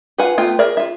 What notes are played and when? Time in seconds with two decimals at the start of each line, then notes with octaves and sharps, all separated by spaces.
0.18 F4 B4 F5 F#5 G#5
0.38 A3 B3 F4 G5
0.59 G#4 A#4 D5 E5
0.77 F4 E5